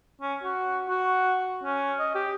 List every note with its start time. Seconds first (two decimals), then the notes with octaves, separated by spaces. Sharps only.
0.21 C#4
0.43 F#4
0.89 F#4
1.63 C#4
1.99 D#5
2.15 G4